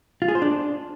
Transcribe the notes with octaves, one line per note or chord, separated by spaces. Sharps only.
F4
G#4
C5
D4